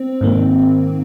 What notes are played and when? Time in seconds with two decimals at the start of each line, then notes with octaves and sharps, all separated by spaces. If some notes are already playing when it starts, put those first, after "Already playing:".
Already playing: C4
0.21 G#2 D#3 A#3